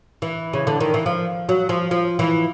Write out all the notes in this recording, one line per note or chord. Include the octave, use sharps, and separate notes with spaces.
E3
C#3
D3
D#3
E3
F3
F#3
F3
F3
E3